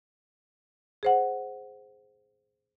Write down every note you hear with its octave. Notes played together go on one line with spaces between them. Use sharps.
G#4 C5 F#5